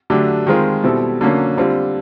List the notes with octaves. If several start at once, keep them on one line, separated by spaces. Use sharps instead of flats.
D3 F#3 A3 D4 G4
D#3 G#3 C4 F4 G#4
B2 G3 C4 E4 A4
D3 F#3 A#3 C#4
D3 G3 C4 F4